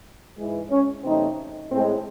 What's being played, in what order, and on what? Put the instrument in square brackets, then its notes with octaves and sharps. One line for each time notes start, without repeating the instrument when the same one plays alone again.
[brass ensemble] G#2 E3 G#3
C#4
E2 C3 F#3 A3 C4 D#4
A2 G#3 C4